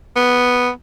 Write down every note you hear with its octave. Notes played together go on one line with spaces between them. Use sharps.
B3